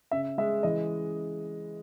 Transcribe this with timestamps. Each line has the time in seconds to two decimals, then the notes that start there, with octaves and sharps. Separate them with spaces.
0.11 C#3 E5
0.38 G#3 E5
0.63 E3 D#5